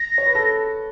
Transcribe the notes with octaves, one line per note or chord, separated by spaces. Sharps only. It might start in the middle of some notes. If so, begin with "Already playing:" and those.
Already playing: A#6
C#5
B4
A4